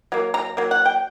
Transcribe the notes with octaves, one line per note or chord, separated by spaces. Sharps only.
F#3 A#3
A#5
F#3 A#3
F#5
G5